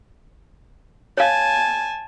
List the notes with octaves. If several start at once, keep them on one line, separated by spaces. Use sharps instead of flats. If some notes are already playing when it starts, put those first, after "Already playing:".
C#5 F5 G#5 A5